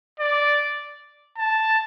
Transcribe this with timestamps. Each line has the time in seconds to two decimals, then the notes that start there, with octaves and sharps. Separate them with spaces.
0.20 D5
1.38 A5